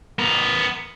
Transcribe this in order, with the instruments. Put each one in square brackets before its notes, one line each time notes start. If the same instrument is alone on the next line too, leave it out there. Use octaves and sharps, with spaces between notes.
[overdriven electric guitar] B3 A#4